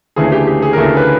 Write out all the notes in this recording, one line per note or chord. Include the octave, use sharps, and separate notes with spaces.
D2 C#3 E3 A3 G#4
G4
G4
G#4
A#4
D2 C#3 E3 A3 A4
B4